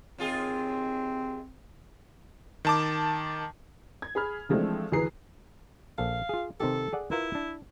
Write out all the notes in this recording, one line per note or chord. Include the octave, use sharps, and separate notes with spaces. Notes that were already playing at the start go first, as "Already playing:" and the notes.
D#2 C4 F4 G#4
D#3 A5 D6
G#6
G#4 B5 F6
E3 F3 G#3 A3 C4 D4
D2 E3 G#4 B4 A#5 C7
A#1 A4 F5
F4 G#4
C3 D#3 G4 A4
G#4 D5 F#5
E4 F4 A#4 B4
D4